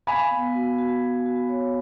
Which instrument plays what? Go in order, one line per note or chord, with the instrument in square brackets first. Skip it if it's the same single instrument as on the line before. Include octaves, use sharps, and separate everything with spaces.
[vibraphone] F5 [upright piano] G#5 B5
[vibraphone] B3
F#4
F#4
F#4
F#4
C#5